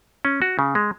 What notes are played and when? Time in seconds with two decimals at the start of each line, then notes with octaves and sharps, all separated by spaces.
0.25 C#4
0.42 F#4
0.59 C#3
0.75 G#3